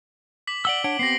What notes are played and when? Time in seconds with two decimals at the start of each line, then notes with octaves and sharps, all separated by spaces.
0.47 D6 B6 F#7
0.65 D5 F#5 E6 D7 F#7 G7
0.84 D4 C#5 F#5 D7
0.99 B3 C4 G4 A#6 C7